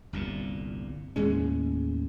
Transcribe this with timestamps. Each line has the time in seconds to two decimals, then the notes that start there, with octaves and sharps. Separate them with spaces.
0.13 G1 C2 A#2
1.16 D#2 A2 G#3 C#4